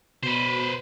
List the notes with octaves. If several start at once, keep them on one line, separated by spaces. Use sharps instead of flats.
B2 B4 C5